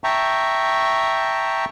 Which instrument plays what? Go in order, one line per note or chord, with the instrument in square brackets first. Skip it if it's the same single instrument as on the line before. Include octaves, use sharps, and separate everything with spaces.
[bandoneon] E5 G5 A5 A#5 C#6